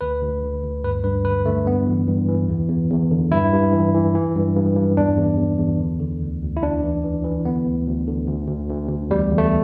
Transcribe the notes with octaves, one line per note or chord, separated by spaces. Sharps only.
D2 B4
D2
D3
D2
G2 B4
G2 B4
D3 B4
D3 A3
G2 B3
E3
G2
E3
E2
E2
E2
D3
G2 E4
G2
E3
E3
E3
G2
G2
G2
E2 D4
E2
E2
E2
D3
D3
D2
D2
E4
E2 D4
E3
E3
E3
D3 B3
D2
D2
D3
D2
D2
D2
D2
E2 G3
E2
A3